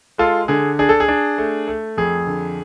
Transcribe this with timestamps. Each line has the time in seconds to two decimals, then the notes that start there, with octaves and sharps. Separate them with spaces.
0.18 G#3 F4 A4
0.48 D3 G#4
0.79 D4 G#4
0.89 A4
1.00 G#4
1.08 D4
1.38 A3
1.67 A3
1.97 F2 G#4
2.27 D3